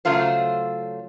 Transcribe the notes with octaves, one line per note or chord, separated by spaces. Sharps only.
C#3 F#3 A3 F4 C5